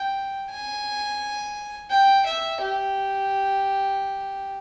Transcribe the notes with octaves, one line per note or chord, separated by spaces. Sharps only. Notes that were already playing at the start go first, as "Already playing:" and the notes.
Already playing: G5
G#5
G5
E5
G4